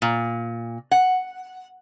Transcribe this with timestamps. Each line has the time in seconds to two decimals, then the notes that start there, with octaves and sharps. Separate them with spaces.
0.02 A#2
0.91 F#5